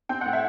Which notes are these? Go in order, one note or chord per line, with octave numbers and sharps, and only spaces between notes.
C4 G5
A2 F#5
E5